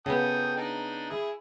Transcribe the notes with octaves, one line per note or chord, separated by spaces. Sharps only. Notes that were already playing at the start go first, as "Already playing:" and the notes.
C#3 B3 A4 G5 D#6
D4 D#4
E4 G#4